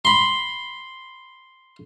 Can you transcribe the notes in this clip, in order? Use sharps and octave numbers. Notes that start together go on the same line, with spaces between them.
B5 C6